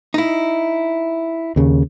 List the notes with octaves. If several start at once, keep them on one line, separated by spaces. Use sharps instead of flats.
D#4 E4
D#2 C#3